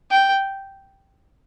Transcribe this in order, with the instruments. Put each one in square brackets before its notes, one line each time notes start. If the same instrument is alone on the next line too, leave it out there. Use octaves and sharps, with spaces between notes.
[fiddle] G5